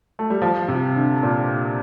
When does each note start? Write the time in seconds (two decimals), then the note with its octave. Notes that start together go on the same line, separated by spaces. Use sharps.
0.19 A3
0.30 G3
0.42 F3
0.68 C3
0.96 D3
1.23 A#2